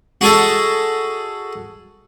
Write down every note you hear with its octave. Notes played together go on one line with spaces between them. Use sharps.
F#4 G#4 A4 D#5